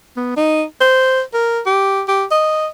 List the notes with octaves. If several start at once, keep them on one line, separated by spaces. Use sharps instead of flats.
B3
D#4
C5
A#4
G4
G4
D#5